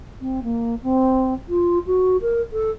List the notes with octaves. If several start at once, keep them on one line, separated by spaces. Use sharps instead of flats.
C4
A#3
C4
F4
F#4
A#4
A4